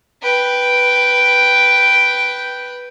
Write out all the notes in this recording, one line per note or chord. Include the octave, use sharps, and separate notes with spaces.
B4 G5